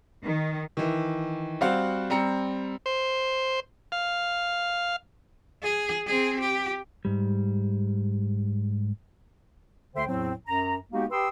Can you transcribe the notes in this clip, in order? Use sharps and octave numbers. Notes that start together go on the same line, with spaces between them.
D#3
D#3 E3
G3 C4 F#4 C5 F5 F#5
G3 C4 A#5 C#7
C5
F5
G#4
C4 G#4
G4
G#2 G3
D2 D3 C5 E5 G5 C6
E2 A2 F#3 C4
F#2 A#5
G#3 A#3 B3 D#4 F#4 G4
G4 B4 G5 C6 D#6 E6